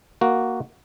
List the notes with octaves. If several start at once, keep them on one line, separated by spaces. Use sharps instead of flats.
A#3 F#4